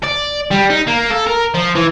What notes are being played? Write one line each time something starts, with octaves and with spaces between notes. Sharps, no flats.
D5
G3
D#4
A#3
A4
A#4
F3
E3